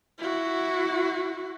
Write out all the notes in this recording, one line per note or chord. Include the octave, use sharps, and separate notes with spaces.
E4 F#4